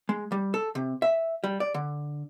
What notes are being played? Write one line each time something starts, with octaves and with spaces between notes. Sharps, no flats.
G#3
G3
A4
C3
E5
G3
D5
D3